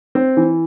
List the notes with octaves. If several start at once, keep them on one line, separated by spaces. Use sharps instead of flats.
C4
E3